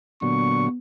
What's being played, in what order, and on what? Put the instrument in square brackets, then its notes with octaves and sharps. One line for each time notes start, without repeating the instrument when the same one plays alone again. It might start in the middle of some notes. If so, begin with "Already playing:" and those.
[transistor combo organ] A#2 D3 F#3 [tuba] B3 [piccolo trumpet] C#6